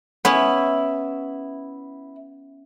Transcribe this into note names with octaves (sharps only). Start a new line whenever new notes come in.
B3 C#4 E4